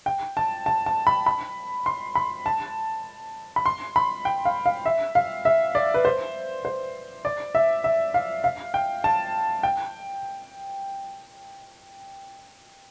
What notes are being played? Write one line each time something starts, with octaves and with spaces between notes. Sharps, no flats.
G5
A5
A5
A5
B5
B5
C6
B5
A5
B5
C6
B5
G5
F5
F5
E5
F5
E5
D5
B4
C5
C5
D5
E5
E5
F5
F5
G5
A5
G5